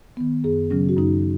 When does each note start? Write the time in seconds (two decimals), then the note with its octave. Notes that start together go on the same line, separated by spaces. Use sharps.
0.17 D#3 B3
0.44 F#2 G#4
0.70 C#3 F#3 C#4
0.89 F#4
0.97 F#2 D#4